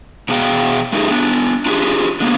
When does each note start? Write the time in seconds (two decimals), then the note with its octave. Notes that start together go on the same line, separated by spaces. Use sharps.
0.29 B2 B3 G#4 F5 G5
0.93 G#3 A3 D#4 F4 G4 G#4
1.11 B3 D4
1.66 D4 F4 G4 G#4
2.20 D3 A#3 B3